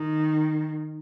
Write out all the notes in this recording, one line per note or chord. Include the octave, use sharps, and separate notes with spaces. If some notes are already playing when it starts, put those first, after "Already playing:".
Already playing: D#3